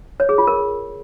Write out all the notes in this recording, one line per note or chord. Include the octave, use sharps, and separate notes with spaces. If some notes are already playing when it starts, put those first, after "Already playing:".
C#5
G#4
F4
A#4